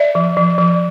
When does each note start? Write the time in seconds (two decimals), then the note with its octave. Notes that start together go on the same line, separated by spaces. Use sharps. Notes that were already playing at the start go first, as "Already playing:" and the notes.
Already playing: D5 E5
0.15 F3
0.37 F3
0.58 F3